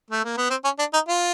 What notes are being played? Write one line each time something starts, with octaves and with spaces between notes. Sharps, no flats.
A3
A#3
B3
C4
C#4
D4
D#4
F4